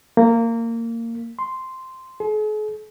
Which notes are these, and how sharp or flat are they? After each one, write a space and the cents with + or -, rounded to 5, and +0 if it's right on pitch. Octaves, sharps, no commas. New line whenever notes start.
A#3 -20
C6 -5
G#4 +45